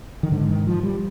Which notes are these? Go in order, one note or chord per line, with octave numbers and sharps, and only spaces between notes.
D#3
G#2 D3
D#3
F3
G3